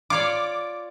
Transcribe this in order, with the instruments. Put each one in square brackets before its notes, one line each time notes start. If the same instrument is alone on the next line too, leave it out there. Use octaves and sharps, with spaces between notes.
[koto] F4 C#5 D5 [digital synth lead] D6